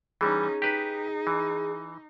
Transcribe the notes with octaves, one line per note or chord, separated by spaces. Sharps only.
E3 G3 C#4 D#4 G#4
D#4 G4 B4
E3